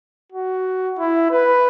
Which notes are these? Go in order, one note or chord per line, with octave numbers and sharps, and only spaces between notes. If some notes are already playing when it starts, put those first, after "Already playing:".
F#4
E4
B4